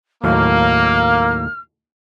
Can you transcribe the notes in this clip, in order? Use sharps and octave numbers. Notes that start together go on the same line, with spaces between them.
D#2 A2 F#3 A#3 F6